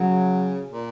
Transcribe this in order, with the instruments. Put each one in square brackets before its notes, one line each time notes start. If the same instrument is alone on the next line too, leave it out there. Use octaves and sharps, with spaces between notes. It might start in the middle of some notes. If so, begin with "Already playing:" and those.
Already playing: [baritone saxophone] C#3 [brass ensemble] F#3
[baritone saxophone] A#2